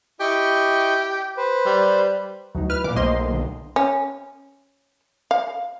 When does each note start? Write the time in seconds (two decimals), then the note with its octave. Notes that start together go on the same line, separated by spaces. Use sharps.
0.20 E4 G4 D#5 C#6
1.37 B4 C5
1.66 G3
2.55 D2 F#3 D#4
2.70 E4 B4 F6
2.84 A#2 D6
2.96 B1 A3 A#3 C5 D#5 C6
3.31 D3
3.76 C#4
5.31 F5